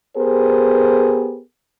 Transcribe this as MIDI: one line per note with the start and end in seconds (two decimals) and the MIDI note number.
0.17 1.40 59
0.17 1.40 67
0.17 1.40 68
0.17 1.40 70
0.17 1.40 72